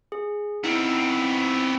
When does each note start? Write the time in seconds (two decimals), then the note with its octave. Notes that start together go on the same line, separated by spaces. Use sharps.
0.12 G#4
0.64 B3 C4 D#4 E4